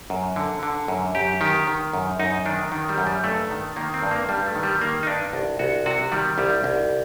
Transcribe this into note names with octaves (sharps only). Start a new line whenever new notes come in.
F#2
D3
D3
F#2
F#2 G4
D#3 G4
D#3
F#2
F#2 D#4
D#3 D4
D#3
G3
F#2
G3
G2 A3
D#3
D#3 A#3
C4
G2
A#3
G2 G3
A3
D#3
G3
D#3 A#3
D#4
G2 D4
C2
C2 F#4
C3 F#4
D#3 G3
C2 G3
C2